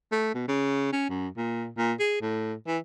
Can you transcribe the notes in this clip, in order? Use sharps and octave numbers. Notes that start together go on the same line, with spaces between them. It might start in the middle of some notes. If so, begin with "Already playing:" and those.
A3
B2
C#3
C#4
F#2
A#2
A#2
G#4
A2
E3